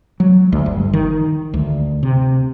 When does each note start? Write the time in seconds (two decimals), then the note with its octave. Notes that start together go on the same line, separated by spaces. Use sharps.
0.20 F#3
0.52 D2
0.66 G1
0.93 D#3
1.54 D2
2.03 C3